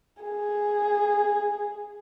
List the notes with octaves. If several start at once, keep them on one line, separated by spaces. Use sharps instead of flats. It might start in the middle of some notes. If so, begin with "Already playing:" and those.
G#4